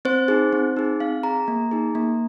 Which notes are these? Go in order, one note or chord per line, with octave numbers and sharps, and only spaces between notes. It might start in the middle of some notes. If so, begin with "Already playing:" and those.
C4 C5
D#4 G#4
C4
D#4 G#4
C4 F5
G#4 A#5
A#3
D#4 G#4
A#3